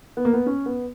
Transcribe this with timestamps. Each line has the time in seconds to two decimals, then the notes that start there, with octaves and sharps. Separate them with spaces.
0.17 B3
0.25 A#3
0.33 B3
0.46 C#4
0.66 B3